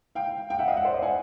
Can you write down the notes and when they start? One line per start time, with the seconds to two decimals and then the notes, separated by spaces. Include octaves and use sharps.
0.15 F5 G5
0.50 F5 G5
0.59 E5 F#5
0.68 D#5 F5
0.76 E5 F#5
0.85 C5 D5
0.94 C#5 D#5
1.02 F#5 G#5